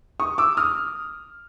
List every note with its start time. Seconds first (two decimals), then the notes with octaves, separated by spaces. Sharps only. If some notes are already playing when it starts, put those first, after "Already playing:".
0.20 C#6 D#6
0.38 D6 E6
0.57 D#6 F6